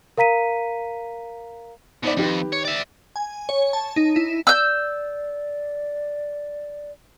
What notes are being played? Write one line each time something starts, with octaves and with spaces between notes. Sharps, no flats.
A#4 F5 A#5 B6 D#7
B2 D#4 E4 C5 D5
F2 D#3 G4 B4
C#5
D5 E5
G#5
C#5
A5
D#4
E4
D5 E6 G6